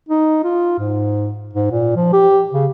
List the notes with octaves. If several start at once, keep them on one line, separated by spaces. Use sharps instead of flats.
D#4
F4
G#2
G#2
A#2
F3
G4
C#3